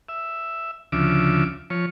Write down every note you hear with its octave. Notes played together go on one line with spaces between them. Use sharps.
E5
D2 C#3 F3 E5 D6
F3 C#5